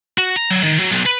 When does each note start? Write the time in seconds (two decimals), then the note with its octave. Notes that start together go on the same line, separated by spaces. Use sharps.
0.18 F#4
0.36 A#5
0.51 F#3
0.63 D#3
0.79 F#3
0.92 B1
1.06 B4